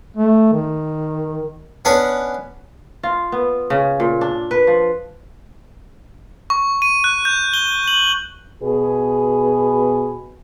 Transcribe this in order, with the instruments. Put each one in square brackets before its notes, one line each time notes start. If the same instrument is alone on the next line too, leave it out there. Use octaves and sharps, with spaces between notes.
[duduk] A3
D#3
[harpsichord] B3 C#4 D4 B4
[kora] F4
B3
C#3
A#2
D4
B4
F3
[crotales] C#6
D#7
F#6
G6
G7
F#7
[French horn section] B2 B3 G#4